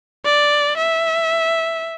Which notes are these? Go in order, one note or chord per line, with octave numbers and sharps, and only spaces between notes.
D5
E5